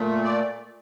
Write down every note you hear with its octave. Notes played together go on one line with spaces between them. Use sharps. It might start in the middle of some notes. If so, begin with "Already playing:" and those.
Already playing: A#2 A3
D5